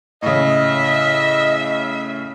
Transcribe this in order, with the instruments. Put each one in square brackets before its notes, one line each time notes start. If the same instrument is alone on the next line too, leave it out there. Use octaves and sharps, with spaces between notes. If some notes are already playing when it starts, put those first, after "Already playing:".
[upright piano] A2 C#3 [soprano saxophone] D#5 [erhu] E5